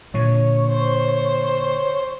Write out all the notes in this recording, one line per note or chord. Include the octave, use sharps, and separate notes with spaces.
A#2 D3 C#5
C5